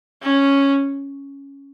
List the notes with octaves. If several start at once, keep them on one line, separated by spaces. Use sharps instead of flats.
C#4